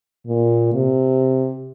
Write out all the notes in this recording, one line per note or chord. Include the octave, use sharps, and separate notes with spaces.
A#2
C3